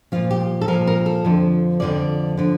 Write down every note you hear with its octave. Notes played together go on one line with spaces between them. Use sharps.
A#2 F3 F4
G4
A4
A#2 F3 A#4
A#4
A4
F2 D3 F3
F2 D3 F3 D5
D3 F3